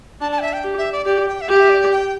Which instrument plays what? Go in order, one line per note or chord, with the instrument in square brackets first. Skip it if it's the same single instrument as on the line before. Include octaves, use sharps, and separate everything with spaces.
[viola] D4 [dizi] A5
[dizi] A5
G5
E5
G5
[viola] G4
[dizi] E5
D5
[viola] G4 [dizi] D5
[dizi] G5
E5
[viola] G4 [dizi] G5
[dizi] E5
D5
D5
G5